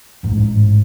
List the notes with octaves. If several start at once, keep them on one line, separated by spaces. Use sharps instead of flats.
A1 G#2